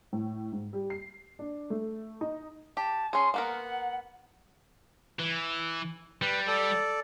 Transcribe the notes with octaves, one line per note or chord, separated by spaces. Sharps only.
A2
G#2
G3
C7
D4
A3
D#4
G4 A5
C#4 G#4 C6
A#3 B3 A#4 F#5
E3
G3 B4
A4 D5